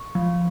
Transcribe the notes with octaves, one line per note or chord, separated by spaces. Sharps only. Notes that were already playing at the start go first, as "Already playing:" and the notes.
Already playing: C#6
F3